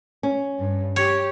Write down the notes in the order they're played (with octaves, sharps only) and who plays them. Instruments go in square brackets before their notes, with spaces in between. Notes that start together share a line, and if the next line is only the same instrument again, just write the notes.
[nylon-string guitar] C#4
[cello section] G2
[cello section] G4 [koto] C#5